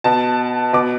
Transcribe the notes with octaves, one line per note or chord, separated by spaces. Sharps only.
B2 A5
B2 D6